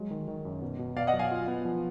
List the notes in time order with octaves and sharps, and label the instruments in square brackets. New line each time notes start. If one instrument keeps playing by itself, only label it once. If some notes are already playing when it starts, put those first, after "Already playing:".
Already playing: [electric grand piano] F#3 G#3
D#3
D#3
F#2
B2
B2
[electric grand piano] B2 [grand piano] D5 F5
[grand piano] D#5 F#5
[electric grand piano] F#3
[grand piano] F5 G#5
[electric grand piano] F4
B3
F3